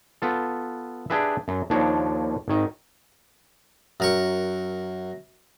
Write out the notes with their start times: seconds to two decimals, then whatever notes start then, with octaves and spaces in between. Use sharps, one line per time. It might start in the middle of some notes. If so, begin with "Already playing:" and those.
0.22 B3 F4 A4
1.10 D4 G4 G#4 B4 E5
1.48 F#2
1.70 D#2 F3 D4 C#5
2.48 G#1 D#3
4.00 F#2 A#4 C#6